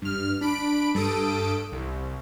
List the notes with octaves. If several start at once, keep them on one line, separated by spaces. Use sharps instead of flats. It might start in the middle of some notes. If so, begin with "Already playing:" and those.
G2 F6
D4 B5 D7
G2 A4 D#6 D7
C2